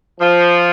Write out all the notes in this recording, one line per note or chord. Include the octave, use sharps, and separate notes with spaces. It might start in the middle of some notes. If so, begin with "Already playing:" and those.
F3